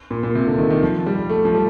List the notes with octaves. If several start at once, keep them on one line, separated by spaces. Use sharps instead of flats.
A#2
A#2
C3
D3
D#3
D#3
F3
G3
A3
F3
G3